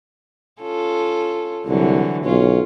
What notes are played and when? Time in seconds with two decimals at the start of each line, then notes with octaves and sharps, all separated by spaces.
0.62 C#4 F4 A4
1.66 C2 D3 E3 F#3
2.25 B1 C#4 F4